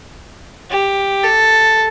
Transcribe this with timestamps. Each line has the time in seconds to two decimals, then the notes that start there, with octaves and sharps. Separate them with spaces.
0.71 G4
1.24 A4